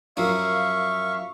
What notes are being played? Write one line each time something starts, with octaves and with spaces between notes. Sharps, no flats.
F#2 F3 A#3 E5 F5 C#6